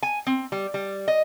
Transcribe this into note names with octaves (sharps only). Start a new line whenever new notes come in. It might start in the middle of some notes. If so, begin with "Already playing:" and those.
G#5
C4
G3
G3
D#5